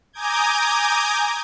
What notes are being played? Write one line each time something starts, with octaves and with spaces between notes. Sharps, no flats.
G#5 A#5 D6 D#6 G6 G#6